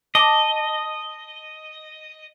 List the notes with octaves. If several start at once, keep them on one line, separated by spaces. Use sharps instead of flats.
D#5 A5 D6